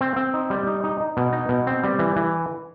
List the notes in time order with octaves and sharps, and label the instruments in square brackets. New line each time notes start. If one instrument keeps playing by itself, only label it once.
[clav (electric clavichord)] C4
C4
D#4
G3
D#4
D#4
D#4
B2
D#4
B2
C4
G3
E3
E3